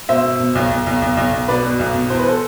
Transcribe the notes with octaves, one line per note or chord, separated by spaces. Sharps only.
B2 C5 E5
B2
B2
B1
B1
B1
B1
B1
B1
B2 B4 D5
B2
B1
B2
E2 C5
B4
A4 C5